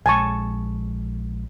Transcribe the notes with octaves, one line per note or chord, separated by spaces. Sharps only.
A#1 G#3 G#5 A5 C#6